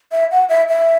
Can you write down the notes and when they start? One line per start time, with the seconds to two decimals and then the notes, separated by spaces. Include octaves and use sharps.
0.12 E5
0.31 F#5
0.49 E5
0.69 E5